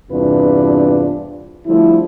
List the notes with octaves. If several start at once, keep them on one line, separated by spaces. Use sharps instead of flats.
E2 G2 C3 D4 F4 B4
D3 F3 G3 A3 E4